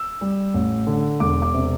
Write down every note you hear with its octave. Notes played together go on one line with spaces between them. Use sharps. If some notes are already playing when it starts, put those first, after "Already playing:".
Already playing: E6
G3
A1
D3
E1 D6
D6
C3